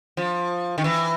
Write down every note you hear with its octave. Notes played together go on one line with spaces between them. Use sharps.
F3
D#3
E3